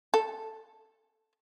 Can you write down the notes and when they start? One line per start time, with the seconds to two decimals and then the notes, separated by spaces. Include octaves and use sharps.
0.14 A4